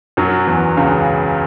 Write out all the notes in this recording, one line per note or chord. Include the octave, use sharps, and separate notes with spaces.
F#2 F#3
E2 E3
C#2 C#3